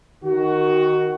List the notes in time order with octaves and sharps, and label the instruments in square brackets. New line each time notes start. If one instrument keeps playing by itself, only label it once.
[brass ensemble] D#3 F#4